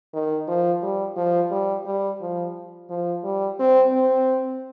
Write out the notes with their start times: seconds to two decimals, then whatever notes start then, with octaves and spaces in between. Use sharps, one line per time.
0.14 D#3
0.47 F3
0.83 G3
1.17 F3
1.51 G3
1.86 G3
2.21 F3
2.89 F3
3.24 G3
3.59 C4
3.93 C4